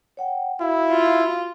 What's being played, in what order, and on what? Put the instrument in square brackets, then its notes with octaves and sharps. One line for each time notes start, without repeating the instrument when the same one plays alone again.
[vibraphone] C#5 F#5 G5
[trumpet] E4 [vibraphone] F#4 F5
[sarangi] F4